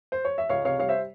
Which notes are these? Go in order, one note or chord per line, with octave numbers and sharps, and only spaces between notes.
C5
C#5
E5
C#2 C#5 F5
C3 C#5 F5
G3 C#5 F5
C5 E5